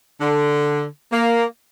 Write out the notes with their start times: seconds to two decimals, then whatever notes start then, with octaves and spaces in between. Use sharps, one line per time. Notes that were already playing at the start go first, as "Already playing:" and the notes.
0.20 D3
1.12 A#3